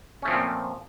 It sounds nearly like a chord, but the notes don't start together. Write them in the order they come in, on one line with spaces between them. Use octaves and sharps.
C#4 A3 F3 C4 A#2